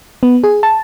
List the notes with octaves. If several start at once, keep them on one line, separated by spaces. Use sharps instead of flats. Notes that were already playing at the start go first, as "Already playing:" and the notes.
B3
G#4
A5